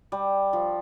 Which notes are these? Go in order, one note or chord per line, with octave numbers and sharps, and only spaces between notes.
G3
F3